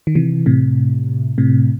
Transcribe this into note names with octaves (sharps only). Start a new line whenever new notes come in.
D#3
C3 E3
A2 C3
A2 C3